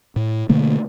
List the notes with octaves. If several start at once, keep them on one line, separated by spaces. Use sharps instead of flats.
A2
B2 D3 A3 A#3